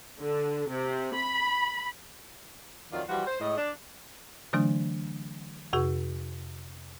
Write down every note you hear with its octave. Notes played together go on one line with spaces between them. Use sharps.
D3
C3
B5
F2 D#3 F#3 D4 F4 D5
E3 F3 G3 F4 F#4
C5
A2 G#3 D#5
D4
D3 E3 F#3 A3 D4
F2 C3 F#4 G#4